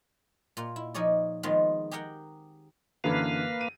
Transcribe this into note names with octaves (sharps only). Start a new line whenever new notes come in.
A#2 F4
E4
F3 D#4 G#4 C#5 D5
D#3 F3 G#3 B3 C4 F4
G4 G#4 A#4 F#5 G5
F#2 D3 E3 A#3 B4 F5
D#7